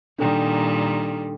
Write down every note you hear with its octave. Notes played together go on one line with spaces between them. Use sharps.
A#2 D#3 G3 D4 A4 G5